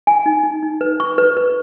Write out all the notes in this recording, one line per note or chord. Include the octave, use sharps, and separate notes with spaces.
G#5
D#4
D#4
D#4
B4
C#6
B4
B4